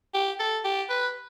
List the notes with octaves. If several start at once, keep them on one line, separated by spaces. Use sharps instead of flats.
G4
A4
G4
B4